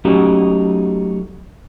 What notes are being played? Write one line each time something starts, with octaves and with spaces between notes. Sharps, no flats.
F#3 A3 C#4 D#4 F#4 G4